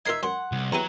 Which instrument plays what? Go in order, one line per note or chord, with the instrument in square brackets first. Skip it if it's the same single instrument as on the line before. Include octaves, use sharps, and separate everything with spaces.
[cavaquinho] D#4 E5 [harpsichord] F4 A#4 D#5 [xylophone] G#6 C7
[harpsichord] F#2 [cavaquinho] F#5 [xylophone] C6
[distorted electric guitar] C2
[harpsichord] E2 E4 G4 [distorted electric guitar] F#3 [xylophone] A#5 D#7